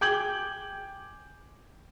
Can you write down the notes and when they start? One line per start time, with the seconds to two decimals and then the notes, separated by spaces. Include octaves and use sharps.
0.01 G5 G#5 D6 G6 G#6 F#7